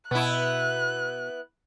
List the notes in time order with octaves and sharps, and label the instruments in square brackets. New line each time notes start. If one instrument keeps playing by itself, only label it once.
[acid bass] B2 [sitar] B3 E4 [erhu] F#6